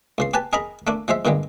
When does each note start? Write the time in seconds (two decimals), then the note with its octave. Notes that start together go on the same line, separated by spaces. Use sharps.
0.18 C#2 C#3 C6
0.34 G4 B4 G#5 A5
0.53 G#4 A#4 D#5 A#5 B5
0.87 A3 A#3 D4
1.08 F3 G#3 C5 E5
1.25 G2 A#2 D3 G3 G#3